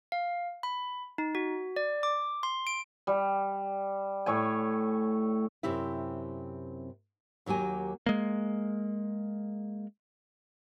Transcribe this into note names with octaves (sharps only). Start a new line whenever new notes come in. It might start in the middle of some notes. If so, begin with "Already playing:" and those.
F5
B5
D#4
F#4
D5
D6
C6
D7
G3
A2 C#5 G#5
F#2 C3 C4 E4 G4 E5
D#2 F#3 A#3 G4 G#5
G#3 A#3